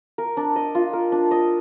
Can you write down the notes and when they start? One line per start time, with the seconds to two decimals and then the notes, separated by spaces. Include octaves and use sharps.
0.18 A#4
0.37 D4
0.56 D#5
0.75 F4
0.93 A#4
1.12 D4
1.31 D#5